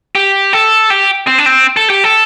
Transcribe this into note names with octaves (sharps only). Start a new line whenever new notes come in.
G4
A4
G4
C4
D4
C4
A4
G4
A4